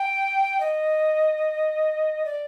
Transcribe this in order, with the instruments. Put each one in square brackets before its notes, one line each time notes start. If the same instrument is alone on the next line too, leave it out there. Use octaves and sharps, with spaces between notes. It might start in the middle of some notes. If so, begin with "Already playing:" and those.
Already playing: [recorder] G5
D#5
D5